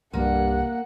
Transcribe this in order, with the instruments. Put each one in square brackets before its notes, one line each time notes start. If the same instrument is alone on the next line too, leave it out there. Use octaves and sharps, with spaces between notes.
[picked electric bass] C2 [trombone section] G2 [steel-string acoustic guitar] A#3 [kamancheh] F#5